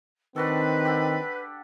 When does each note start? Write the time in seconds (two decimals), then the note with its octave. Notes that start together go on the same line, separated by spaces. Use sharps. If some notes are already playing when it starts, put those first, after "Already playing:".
0.36 D#3 C4 D4 F#4 A4 B4
0.85 G4 A4 F#5